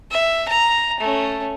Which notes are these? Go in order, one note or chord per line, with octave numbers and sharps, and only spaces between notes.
E5
A#5
A3 C#4